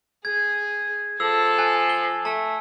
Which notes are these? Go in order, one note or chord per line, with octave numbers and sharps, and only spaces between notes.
G#4 G#6
F3 A4 E6
G#5 F#6
G7
A3 A5